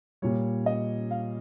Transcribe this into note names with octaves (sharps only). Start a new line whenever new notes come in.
A#2 G3 C#5
D#5
F5